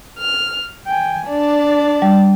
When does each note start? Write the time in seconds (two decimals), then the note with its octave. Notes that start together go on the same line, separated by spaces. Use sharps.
0.18 F6
0.86 G5 G#5
1.27 D4 D5 A5
2.02 G3